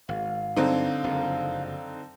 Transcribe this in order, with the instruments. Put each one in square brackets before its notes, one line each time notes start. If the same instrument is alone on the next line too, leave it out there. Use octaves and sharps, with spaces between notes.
[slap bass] G#1 [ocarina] F5
[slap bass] G2 F#3 [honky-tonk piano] D3 C4 D#4
[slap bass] F#1 F2